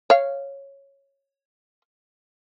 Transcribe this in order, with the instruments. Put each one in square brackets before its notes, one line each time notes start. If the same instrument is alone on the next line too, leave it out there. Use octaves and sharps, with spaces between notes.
[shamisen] C#5 F5